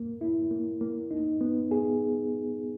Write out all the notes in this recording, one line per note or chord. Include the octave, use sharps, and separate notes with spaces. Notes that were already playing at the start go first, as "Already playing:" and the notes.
Already playing: A#3
E4
A#3
A#3
D#4
B3
G#4